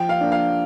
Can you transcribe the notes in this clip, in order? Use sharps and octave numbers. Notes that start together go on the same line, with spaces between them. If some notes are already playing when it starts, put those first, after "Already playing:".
Already playing: F3 G5
F5
A#3 D4
F5